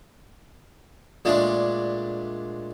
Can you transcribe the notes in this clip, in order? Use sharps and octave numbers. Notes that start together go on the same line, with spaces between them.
A#2 G#3 A3 D4